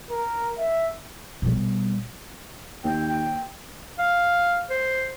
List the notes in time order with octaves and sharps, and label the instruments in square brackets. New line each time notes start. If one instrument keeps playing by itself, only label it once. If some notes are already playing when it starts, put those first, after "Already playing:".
[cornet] A#4
E5
[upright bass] B2 G3
[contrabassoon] D#2 [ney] G5
[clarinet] F5
C5